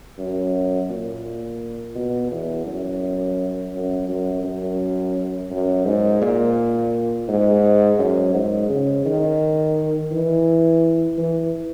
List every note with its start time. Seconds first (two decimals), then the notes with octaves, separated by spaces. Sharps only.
0.18 F#2
0.90 A#2
1.95 B2
2.31 E2
2.66 F#2
3.73 F#2
4.09 F#2
4.44 F#2
5.51 F#2
5.86 G#2
6.22 A#2
7.28 G#2
7.99 F#2
8.34 G#2
8.69 C#3
9.06 D#3
10.11 E3
11.18 E3